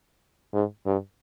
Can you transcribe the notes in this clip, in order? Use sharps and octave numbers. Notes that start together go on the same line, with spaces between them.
G#2
G2